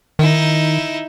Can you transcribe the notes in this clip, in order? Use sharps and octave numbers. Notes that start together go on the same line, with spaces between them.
D#3 D#4 E4